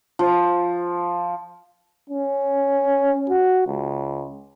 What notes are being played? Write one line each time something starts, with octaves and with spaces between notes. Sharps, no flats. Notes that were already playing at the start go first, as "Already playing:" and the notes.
F3
C#4
F#4
C#2